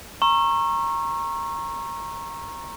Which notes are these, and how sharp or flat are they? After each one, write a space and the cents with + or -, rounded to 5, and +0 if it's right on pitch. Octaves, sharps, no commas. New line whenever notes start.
A#5 +0 C#6 -25 E6 +35